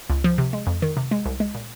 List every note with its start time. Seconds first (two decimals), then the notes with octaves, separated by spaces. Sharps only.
0.10 C#2
0.24 F3
0.38 C3
0.53 G#3
0.67 F2
0.82 D#3
0.97 C3
1.11 G#3
1.25 C2
1.40 G#3
1.55 A#2